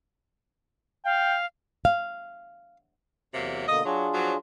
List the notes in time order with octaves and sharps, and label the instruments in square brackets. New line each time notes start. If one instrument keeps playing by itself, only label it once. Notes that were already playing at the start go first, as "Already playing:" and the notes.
[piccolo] F5 [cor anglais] G5
[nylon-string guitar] F5
[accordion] E2 [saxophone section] C3 F#3 A#3
[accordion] B2 D3 A#3 [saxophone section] D#5
[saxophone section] F#3 [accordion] D4 F4 G#4
[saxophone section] F3 F#3